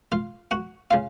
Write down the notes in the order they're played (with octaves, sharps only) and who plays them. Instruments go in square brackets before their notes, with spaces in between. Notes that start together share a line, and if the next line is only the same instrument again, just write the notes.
[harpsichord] F4 F5
F#4 F#5
C#3 F4 F5